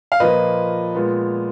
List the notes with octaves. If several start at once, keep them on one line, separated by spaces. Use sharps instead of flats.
F5
A#2 F3 A#3 B4 D#5
A#2 G#3 B3